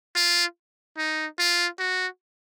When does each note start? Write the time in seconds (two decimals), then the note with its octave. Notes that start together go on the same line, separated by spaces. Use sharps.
0.16 F4
0.97 D#4
1.39 F4
1.79 F#4